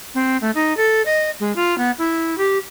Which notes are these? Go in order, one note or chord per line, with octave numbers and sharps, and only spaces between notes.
C4
A3
D#4
A4
D#5
G#3
F4
B3
E4
G4